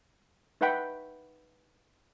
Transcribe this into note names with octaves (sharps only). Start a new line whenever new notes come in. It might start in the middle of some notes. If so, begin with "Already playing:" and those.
D#4 B4 E5 F#5 G5 B5